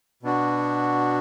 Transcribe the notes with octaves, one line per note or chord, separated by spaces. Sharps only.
B2 B3 D4 F#4